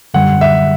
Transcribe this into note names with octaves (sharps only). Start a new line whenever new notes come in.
F#2 D3 G3 F#5
E5